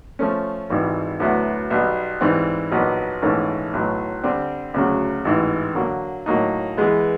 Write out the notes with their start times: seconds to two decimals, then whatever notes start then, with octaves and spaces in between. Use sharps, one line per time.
0.19 F3 A3 C#4
0.70 G#1 G#2 E3 G3
1.20 D2 D3 F#3 B3 E4
1.70 B1 B2 G3
2.21 G#2 E3 G3 C4
2.71 A#1 A#2 F#3 B3 D#4
3.22 A#1 G#2 E3 A3 C#4
3.73 B1 A2 F#3
4.24 D3 G3 C4
4.74 D2 C#3 F#3
5.25 A1 G#2 E3
5.75 D3 F#3 A#3
6.26 A2 F#3 A#3 D#4
6.77 E3 G#3 B3